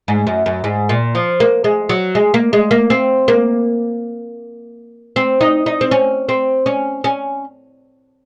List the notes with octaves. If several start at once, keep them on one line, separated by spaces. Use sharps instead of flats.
G#2
F#2
F#2
G#2
A#2
F3
A#3
G#3
F#3
G#3
A#3
G#3
A#3
C4
A#3
C4
D#4
D#4
C4
C#4
C4
C#4
C#4